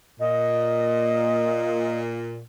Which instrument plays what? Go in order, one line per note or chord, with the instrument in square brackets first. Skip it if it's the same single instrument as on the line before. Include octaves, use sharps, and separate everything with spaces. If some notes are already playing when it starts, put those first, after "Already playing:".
[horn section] A#2 [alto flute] D#5